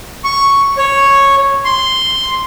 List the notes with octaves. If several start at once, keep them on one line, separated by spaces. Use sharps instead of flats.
C#6
C#5
C6